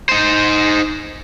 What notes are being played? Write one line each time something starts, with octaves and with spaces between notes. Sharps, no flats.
D#4 C5